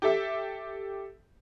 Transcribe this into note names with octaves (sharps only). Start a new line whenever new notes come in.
G4 A4 E5